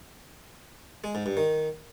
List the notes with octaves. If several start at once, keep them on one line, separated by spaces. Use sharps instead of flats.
G#3
G#2
G2
D#3